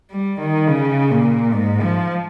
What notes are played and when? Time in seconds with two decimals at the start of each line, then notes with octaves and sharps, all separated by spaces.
0.11 G3
0.39 D#3
0.68 C#3
1.11 A#2
1.54 G#2
1.82 F3